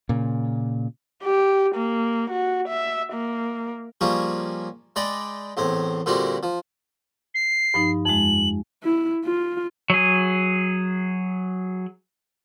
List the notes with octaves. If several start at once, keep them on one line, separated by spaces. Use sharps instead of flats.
A#2 C#3
G4
A#3
F#4
E5
A#3
F3 G3 A#3 C#4 G#4
G#3 D5 D#5 G5 B5
E2 A2 C4
A#2 D3 G3 C4 F#4
F3
C7
G2 F3 D#4
F2 G#3 F#7
E4
F4
F#3 G#4